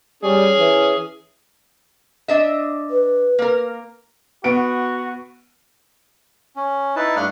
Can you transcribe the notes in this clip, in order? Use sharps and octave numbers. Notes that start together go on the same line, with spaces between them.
G3 C#4 G#4
E3
D4 D#5 E5
B4
A#3 A#4
B3 F#4 D7
C#4
D#4 E4 B4 A5
G2 A3 D4 F5 F#5 F6